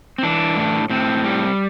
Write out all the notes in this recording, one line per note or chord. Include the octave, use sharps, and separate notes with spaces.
C4
E3 D4
A2
A2 C4
G3